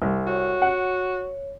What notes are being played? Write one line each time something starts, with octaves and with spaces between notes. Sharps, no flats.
C2
F#4 C#5
F#5